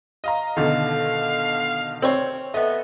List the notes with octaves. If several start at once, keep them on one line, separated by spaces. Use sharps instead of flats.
D#5 F5 A#5
B2 D3 D#3 A4 F5
C4 C#5
A3 B3 D#5